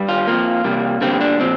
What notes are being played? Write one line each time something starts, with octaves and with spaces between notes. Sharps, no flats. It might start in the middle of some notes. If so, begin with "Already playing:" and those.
Already playing: G2 G3
F4
F2 F3 A#3
C3 G3 A#3
G2 D3 G3 A#3 C4
D4
A#2 F3 C4